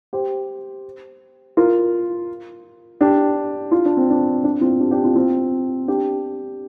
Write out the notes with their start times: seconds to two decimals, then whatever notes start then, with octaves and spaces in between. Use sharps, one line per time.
0.13 G4 C5
1.57 F4 A#4
3.01 D4 G4
3.71 F4
3.85 D4
3.97 C4
4.10 D4
4.44 D4
4.61 C4 F4
4.80 D4 G4
4.91 D4 G4
5.03 C4 F4
5.16 C4 F4
5.88 D4 G4